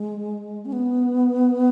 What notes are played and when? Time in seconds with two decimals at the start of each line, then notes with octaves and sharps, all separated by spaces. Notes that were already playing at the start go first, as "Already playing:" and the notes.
Already playing: G#3
0.65 C#4
0.72 B3